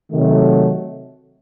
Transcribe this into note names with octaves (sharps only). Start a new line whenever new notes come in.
C3 D#3 F#3 A3